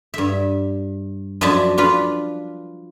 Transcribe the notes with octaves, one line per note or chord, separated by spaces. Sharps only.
G2 E5
F#2 F3 D4 D#5 E5 A5
D4 F4 B4